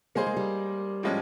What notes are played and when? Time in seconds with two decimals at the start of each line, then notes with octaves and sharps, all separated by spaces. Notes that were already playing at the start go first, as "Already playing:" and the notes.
0.15 G3 A#3 D#4 G#4 C5
0.26 G#3
0.37 G3
1.03 A2 F3 G#3 C#4